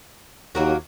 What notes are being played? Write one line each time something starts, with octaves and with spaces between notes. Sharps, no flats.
D#2 F#3 A#3 F#4